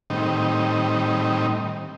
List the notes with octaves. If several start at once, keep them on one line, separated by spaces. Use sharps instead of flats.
A2 D#3 G3 C4 D#4